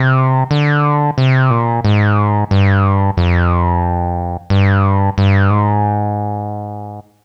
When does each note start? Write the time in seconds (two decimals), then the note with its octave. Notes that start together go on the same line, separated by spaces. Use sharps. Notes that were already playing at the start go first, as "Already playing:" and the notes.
Already playing: C3
0.51 D3
1.18 C3
1.51 A#2
1.85 G#2
2.51 G2
3.17 F2
4.50 G2
5.18 G2
5.50 G#2